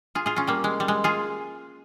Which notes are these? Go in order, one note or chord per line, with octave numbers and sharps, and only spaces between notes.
F4 G#4
F4 G#4
C#4 F4
G3 A#3
G#3
G3
G#3
F4 G#4